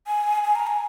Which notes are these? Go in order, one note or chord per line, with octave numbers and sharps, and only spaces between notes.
G#5
G#5
A#5
G#5